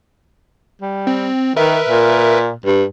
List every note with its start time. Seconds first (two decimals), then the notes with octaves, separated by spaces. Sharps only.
0.82 G3
1.07 C4
1.57 D#3 A#4 B4 E5
1.89 A#2
2.66 G2